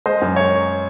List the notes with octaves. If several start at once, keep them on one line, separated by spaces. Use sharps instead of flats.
G#3 C5 D#5
F#2
C#5